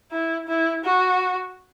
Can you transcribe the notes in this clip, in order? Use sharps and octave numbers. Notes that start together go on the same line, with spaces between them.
E4
E4
F#4